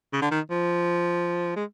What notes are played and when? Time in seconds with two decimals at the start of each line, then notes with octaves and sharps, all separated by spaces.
0.13 C#3
0.21 D3
0.31 D#3
0.50 F3
1.56 G#3